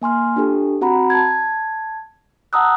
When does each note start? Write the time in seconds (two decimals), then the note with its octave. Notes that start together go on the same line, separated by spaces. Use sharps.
0.02 A#3 G#5 C6 F6
0.36 D4 F4 G4 A4
0.81 C4 F#4 F#5 A#5 B5
1.10 A5 G#6
2.53 F#5 A5 A#5 D#6 E6 F#6